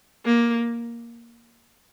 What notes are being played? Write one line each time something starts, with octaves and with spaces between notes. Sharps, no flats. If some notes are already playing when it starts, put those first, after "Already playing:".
A#3